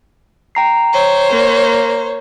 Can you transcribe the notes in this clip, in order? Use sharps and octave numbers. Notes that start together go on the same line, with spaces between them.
G5 A#5 C7
C5 C#5
A#3